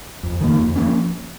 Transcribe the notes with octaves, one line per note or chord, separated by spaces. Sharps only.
F2
D#3 F#3 A#3
F2
F3 A#3 C#4